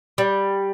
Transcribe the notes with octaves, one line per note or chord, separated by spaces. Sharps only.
G3